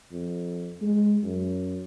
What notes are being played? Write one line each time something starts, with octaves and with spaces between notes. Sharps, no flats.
F2
G#3
F#2